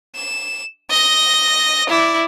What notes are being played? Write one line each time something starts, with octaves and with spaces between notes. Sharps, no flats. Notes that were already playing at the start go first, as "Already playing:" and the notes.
E7
D#5 A#6
E4 D5